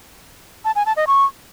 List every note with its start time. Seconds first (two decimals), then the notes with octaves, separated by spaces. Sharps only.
0.65 A5
0.75 G#5
0.86 A5
0.97 D#5
1.07 C#6